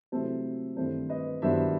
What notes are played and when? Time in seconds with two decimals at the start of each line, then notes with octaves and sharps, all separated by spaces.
0.12 C3 F#3 A3 C4 E4 A4 C5
0.77 G2 D#3 A3 C4 E4 A4 C5
1.09 B4 D#5
1.42 G2 D#3 F#3 B3 E4 C5 E5